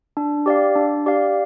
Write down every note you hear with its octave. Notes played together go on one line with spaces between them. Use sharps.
D4
G4 D5 F5
D4
G4 D5 F5